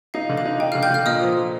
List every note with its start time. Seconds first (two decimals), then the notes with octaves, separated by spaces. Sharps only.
0.14 D#4 F5
0.29 D3
0.37 F5
0.45 D#4
0.60 D#4 G5
0.72 D3 F5 F6
0.83 G5 G6
0.90 D3 F5 F6
1.06 A#2 D#5 D#6
1.21 F3
1.37 F3